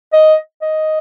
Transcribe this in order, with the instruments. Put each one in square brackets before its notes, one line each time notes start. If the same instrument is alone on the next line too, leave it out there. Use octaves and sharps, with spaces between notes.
[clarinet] D#5
D#5